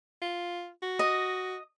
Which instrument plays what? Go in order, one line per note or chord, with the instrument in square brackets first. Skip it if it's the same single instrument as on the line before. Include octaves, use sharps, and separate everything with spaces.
[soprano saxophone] F4
F#4
[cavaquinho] D#5